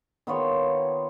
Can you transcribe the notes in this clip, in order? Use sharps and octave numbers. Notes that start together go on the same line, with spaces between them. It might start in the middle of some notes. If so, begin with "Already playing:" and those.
D#3 B3 F4 C#5